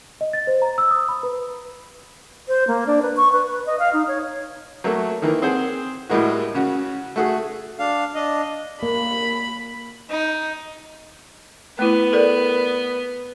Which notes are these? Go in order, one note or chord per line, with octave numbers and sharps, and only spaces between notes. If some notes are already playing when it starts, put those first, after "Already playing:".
D#5
A6
C5
A#5
E6
D#6
B5
B4
C5
A#3
D4
B4
C#6
B4
B4
D#5
F5
D#4
C#5
F#3 A3 A#3
D#3 E3 A#3
C4 G#4 C5 F#5
A2 G3 G#3 A#3 F#4
C#3 C#4 F#4
A3 F#4 G#4
D4 F5
D4 D#5
A#3 B5
D#4
A3 B3 E4
A4 A#4 D5